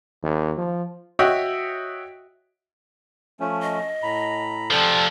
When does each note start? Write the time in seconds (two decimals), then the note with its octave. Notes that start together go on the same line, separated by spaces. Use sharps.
0.23 D#2
0.57 F3
1.19 F#4 C#5 D#5 E5 F#5 G5
3.40 F3 A3 C#4
3.62 D#5
4.03 A2 A#5 B5
4.71 C3 F3 A4 D5